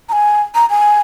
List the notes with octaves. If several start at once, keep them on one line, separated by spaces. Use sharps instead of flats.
A#5
G#5
A#5
G#5